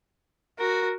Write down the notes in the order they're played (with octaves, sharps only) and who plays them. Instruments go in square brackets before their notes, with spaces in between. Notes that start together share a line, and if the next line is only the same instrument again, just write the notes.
[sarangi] F#4 [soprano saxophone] A#4